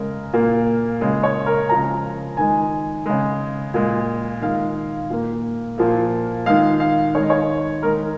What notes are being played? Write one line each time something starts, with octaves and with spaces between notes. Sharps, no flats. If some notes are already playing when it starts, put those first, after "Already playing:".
Already playing: C#3 G#3 A#4
A#2 A#3
C#3 G#3
C#5
A#4
C#3 F3 G#3 A#5
D#3 G#3 G#5
C#3 G#3
A#2 G#3
D#3 G#3 F5
A#2 A#3
A#2 F3 A#3
D#3 G#3 F5
F5
D#3 G#3 C#5
D#5
C#5
D#3 G#3 A#4